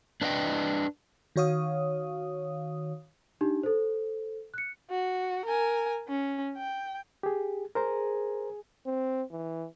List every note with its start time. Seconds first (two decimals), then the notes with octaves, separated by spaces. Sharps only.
0.22 D4 B4 D#5 E5 G5
1.36 D#3 F#4 C#5 F5 D#6
3.41 D4 D#4 G4
3.63 A4 C5
4.54 F#6 C#7
4.90 F#4
5.45 A#4 G#5
6.08 C#4
6.57 G5
7.23 G4 G#4
7.75 G#4 A#4 C5 A#5
8.86 C4
9.31 E3